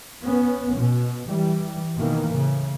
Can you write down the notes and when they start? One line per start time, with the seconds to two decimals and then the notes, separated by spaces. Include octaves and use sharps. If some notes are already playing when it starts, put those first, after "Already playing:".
0.21 B3 C#4
0.76 B2
1.28 E3 G3
1.96 B2 D#3 E3 A#3
2.29 A2 C#3